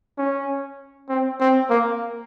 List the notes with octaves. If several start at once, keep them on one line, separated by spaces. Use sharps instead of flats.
C#4
C4
C4
A#3